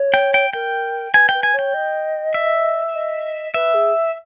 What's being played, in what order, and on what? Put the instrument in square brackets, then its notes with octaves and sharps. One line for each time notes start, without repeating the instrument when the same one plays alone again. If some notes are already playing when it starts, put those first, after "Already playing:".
Already playing: [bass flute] C#5
[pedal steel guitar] G5
G5
[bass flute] A#4 [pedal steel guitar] G5
[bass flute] B4 [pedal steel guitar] G#5
[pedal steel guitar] G5
[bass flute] B4
[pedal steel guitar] G#5
[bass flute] C#5 [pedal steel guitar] G5
[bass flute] D#5
[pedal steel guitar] E5
[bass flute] D#5
[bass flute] B4 [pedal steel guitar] E5
[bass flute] G#4